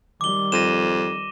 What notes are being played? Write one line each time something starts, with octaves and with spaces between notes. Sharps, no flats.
D#3 G3 D6 G7
F2 A#6 D#7 E7